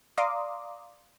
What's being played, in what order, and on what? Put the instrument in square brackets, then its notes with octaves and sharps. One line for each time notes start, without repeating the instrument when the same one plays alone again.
[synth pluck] D5 F5 A#5 C6 D6 D#6